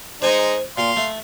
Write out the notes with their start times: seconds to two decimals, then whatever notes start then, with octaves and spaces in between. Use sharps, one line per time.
0.22 G#3 D#4 C5 G#5 C6
0.78 A#2 F5 C6
0.97 A3